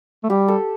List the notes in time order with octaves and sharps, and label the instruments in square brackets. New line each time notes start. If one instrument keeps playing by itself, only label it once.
[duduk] A3
[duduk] G3 [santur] G4
[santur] A4